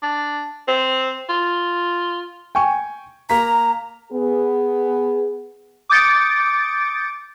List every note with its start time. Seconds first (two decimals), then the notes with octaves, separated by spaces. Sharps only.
0.03 D4
0.68 C4
1.29 F4
2.55 G5 G#5 C#6
3.30 A#3 A#5 B6
4.12 B3 G#4
5.89 D6 D#6 G6 A6 C#7 D7